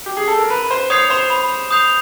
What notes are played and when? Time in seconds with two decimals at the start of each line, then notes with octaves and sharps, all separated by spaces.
0.06 G4
0.17 G#4
0.28 A4
0.38 A#4
0.50 B4 B5
0.71 C5
0.90 C#5 D#6 G6 C7 F7
1.10 C5
1.30 B5
1.71 D#6 G6 C7 F7